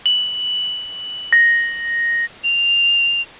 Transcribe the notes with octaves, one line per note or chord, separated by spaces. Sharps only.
F#7
A#6
F7